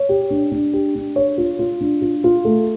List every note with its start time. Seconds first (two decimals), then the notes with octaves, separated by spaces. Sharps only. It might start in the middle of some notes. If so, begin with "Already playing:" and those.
Already playing: C#5
0.09 G4
0.30 D4
0.52 D4
0.73 G4
0.95 D4
1.16 C#5
1.38 F4
1.59 F4
1.81 D4
2.02 F4
2.24 F4
2.45 A3